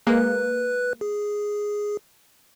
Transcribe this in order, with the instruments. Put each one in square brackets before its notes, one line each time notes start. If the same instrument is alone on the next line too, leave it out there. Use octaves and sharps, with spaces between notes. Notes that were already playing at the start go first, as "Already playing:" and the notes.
[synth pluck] G#3 A#3 [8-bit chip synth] B4 F#6
[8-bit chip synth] G#4